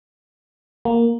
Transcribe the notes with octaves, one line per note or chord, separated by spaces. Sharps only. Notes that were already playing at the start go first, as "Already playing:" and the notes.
A#3